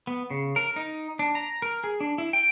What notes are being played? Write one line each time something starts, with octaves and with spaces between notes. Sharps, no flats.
B3
C#3
A#4
D#4
D4
A#5
A#4
G#4
D4
E4
G5